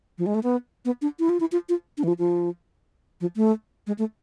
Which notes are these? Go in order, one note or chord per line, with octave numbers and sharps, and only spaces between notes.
F3
G#3
A3
B3
B3
D4
E4
F4
E4
F4
F4
D4
E3
F3
F3
F3
A3
G#3
A3